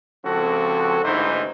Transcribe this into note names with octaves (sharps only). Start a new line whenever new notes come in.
C#2 F3 C4 F#4 A4
A1 G#2 D3 E3 D#4 C5